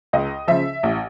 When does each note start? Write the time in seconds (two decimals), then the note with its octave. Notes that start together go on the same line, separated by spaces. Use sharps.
0.13 C#2 D#5
0.48 C#3 F3 E5
0.83 A1